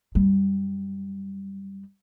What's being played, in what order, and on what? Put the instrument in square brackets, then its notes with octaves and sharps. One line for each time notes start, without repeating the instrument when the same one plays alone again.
[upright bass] F#2 G3